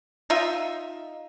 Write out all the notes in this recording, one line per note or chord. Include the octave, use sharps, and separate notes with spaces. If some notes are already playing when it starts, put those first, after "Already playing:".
D#4 F4 E5